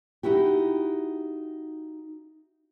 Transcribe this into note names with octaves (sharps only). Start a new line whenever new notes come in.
D#4 E4 F#4 G4